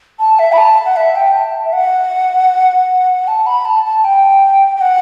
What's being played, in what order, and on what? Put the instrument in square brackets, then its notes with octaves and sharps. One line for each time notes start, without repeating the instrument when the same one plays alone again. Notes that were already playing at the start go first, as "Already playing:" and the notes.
[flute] A5
E5
B5
A5
F#5
E5
G5
A5
E5
F#5
A5
B5
A5
A5
G5
G5
F#5